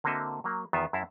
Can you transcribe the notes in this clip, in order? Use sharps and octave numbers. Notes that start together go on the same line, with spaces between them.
D3 A#3 C4 F#4 D#5 E5
F#3 A#3
E2 D#3 B3 F4 E5
F#2 E4 E5 F5 A5 A#5